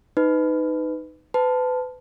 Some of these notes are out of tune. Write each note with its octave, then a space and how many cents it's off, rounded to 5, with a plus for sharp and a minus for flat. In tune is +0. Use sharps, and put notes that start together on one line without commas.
D#4 +0 B4 +20
B4 +35 A5 +0